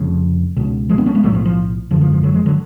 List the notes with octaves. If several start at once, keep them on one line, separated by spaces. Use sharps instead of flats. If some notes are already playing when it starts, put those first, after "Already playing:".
Already playing: F1 F2 C#3
C#2 B2
F3 G#3
B3 D4
A3 C#4
G#3 B3
B1 A2 F#3 A3
F3
F3
G#1 F#2 D3 F3
F3
F3
D3 F#3
F3 G#3
D3 F#3